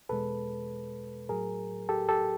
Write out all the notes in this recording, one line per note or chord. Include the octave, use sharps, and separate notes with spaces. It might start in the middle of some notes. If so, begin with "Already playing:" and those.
E2 B2 G#3 A4 B4
A2 F#3 G#4 A#4
G4 A4
G4 A4